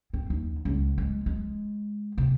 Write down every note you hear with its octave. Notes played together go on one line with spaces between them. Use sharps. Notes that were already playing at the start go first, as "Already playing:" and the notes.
C4
D#2
C#2
G#3
G#3
C3